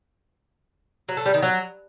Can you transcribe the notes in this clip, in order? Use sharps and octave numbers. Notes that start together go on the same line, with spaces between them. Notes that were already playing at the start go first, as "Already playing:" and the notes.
F#3
A3
G3
D#3
F#3